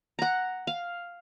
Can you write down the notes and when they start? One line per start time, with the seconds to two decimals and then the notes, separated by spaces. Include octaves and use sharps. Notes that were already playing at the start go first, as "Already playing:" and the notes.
0.19 F#5 A#5
0.67 F5